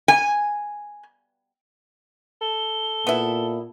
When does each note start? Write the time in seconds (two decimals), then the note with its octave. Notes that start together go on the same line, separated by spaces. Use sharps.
0.08 G#5
2.42 A4 G7
3.07 A#2 B3 E4